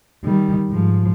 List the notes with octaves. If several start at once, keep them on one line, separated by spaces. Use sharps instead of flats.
D#3 G3
G#2 F3